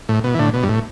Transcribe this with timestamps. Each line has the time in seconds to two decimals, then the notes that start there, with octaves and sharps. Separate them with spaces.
0.09 A2
0.24 B2
0.34 E3
0.39 A2 D3
0.54 B2
0.63 G2
0.69 A2